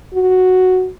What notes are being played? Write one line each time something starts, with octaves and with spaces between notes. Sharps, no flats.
F#4